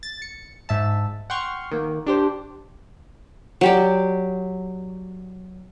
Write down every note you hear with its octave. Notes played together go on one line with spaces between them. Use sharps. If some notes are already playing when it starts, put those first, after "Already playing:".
A6
C#7
G#2 E5 A5
F#5 G5 C6 C#6 F6
D#3 A#3
D4 G4 C5
F#3 G4 D5